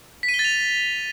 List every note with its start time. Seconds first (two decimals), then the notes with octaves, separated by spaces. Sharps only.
0.23 B6
0.29 D#7
0.34 G7
0.39 A6
0.45 F7